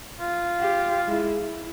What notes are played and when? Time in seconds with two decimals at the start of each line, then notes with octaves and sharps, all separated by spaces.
0.21 F4
0.59 G4 F5
1.07 G#3 E4
1.40 E4